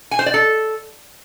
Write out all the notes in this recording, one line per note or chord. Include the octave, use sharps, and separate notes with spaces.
G#5
C5
D5
A4